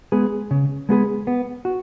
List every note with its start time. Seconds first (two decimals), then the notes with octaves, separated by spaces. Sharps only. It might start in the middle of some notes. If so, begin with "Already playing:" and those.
0.12 G#3 B3 G#4 B4
0.51 C#3
0.89 G#3 B3 G#4 B4
1.27 B3
1.65 F#4